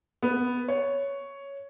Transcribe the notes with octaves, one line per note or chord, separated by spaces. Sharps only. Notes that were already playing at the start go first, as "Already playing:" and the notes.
B3
C#5